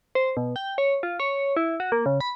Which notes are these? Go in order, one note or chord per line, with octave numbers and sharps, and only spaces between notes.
C5
B2
G5
C#5
F4
C#5
E4
F#4
A#3
C#3
B5